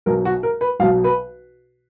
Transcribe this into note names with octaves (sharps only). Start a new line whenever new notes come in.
B1 B2 F#3 A#4
F#4
A#4
B4
B1 B2 F#3 F5
B4